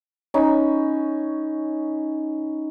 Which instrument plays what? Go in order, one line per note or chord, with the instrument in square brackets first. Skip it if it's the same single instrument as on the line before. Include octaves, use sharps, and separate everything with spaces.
[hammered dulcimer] C#4 D#4 B5